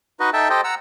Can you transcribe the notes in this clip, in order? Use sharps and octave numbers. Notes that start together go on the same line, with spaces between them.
D#4 F#4 B4 D#5
D#4 A4 E5 G5 A5
G4 A4 C5 D#5 G5
F#5 A#5 E6